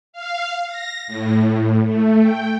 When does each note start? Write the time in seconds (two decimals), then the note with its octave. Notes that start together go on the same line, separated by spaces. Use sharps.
0.13 F5
0.69 A#6
1.08 A2
1.84 A3
2.21 G5